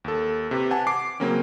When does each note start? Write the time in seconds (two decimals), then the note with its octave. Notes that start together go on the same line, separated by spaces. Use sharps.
0.04 D#2 A4
0.51 C3 G4 B4
0.71 F#5 G#5 A5
0.87 D6 C7
1.20 C#3 F#3 A#3 C4 C#4